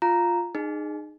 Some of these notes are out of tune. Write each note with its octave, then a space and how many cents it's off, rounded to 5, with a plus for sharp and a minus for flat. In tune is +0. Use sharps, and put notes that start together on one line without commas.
F4 +0 F5 +0 A#5 +0
D#4 -30 G#4 +0